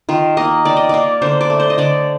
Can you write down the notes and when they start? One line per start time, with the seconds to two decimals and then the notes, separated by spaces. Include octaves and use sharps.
0.09 D#3 F4
0.37 A#3 D#5
0.65 D#3 D5
0.77 D#5
0.89 A#3 D5
1.22 D3 C5
1.41 D5
1.50 A3
1.60 C5
1.70 D#5
1.78 D3 D5